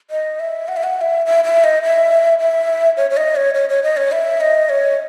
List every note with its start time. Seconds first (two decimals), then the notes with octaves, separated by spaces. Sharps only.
0.11 D#5
0.40 E5
0.68 F#5
0.77 E5
0.84 F#5
0.97 F#5
1.01 E5
1.26 E5
1.44 E5
1.64 D#5
1.83 E5
2.39 E5
2.97 C#5
3.10 C#5
3.17 D#5
3.36 C#5
3.54 C#5
3.69 C#5
3.83 D#5
3.97 C#5
4.12 E5
4.41 D#5
4.69 C#5